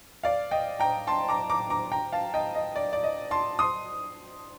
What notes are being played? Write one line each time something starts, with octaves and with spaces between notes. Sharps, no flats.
D5 F5
D#5 G5
G5 A#5
A5 C6
A#5 D6
A#5 D6
A#5 D6
G5 A#5
F5 A5
D#5 G5
D#5
D5
D5
D#5
A5 C6
C6 D#6